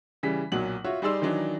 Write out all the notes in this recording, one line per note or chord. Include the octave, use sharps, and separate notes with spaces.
C#3 E3 G3 B6
B1 A#2 F#3 F#7
F4 F#4 C#5 E5
G3 D#4 G#4 D5 C6 E6
D#3 E3 F#3 D4 D#4